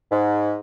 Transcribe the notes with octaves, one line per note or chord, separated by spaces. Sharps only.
G#2